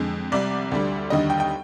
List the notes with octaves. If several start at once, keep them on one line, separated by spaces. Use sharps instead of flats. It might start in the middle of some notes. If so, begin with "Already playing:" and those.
Already playing: F2 D3 G#3
C2 C3 G3 D5
D2 D3 G3
D#2 D3 G3 D#5
G5
G5